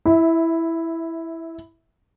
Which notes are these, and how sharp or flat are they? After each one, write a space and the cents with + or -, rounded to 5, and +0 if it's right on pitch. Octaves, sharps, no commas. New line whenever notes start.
E4 +0 E5 -20